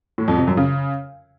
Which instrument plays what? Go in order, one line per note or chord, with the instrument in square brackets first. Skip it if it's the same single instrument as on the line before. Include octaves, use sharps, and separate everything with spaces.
[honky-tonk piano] A2
F2
C3
F#2
C#3